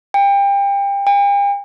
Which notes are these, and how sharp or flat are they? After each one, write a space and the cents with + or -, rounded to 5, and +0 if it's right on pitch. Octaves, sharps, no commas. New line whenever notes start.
G5 +30
G5 +45